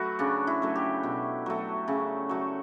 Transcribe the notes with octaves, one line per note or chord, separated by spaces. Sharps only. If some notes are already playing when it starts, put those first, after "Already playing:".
Already playing: F#3 A3 F#4 A4 B4
C#3 D4
E4
F#3 A3
G4
B2
F#3 A3
C#3
F#3 A3